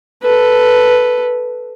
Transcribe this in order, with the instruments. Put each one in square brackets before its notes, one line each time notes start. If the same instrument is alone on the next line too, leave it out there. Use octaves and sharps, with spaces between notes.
[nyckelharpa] A4 B4